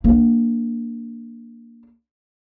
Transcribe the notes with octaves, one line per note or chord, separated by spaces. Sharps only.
A#3 D4